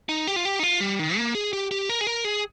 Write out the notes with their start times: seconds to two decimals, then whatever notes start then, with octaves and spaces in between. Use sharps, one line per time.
0.09 D#4
0.27 G4
0.36 F4
0.45 G4
0.59 D#4
0.63 F4
0.81 G3
0.99 D#3
1.17 A#3
1.35 G#4
1.53 G4
1.71 G4
1.89 A#4
2.01 G#4
2.07 A#4
2.24 G#4